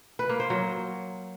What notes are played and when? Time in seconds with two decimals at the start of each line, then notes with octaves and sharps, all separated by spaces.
0.19 B4
0.29 A#3
0.40 C5
0.50 F#3